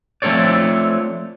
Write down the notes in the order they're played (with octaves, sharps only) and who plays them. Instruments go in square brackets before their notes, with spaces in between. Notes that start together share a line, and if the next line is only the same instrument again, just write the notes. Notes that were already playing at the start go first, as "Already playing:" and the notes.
[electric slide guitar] F3 A3 C4 A4 C#5 D5